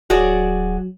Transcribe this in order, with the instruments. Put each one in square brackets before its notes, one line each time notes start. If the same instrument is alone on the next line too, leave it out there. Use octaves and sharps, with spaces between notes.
[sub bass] D1 [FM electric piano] F#3 [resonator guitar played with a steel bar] F#4 G#4 D5